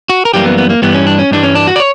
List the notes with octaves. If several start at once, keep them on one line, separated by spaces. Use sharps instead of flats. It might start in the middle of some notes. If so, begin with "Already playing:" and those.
F#4
A#4
F#2 E3 G3 A#3 G4
B3
B3
A#3
G2 E3 G3 B3
C#4
D4
C#4
G2 E3 G3 D4
C#4
D4
F#4
D5
C#5